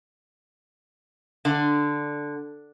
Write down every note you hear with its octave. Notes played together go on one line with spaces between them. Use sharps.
D3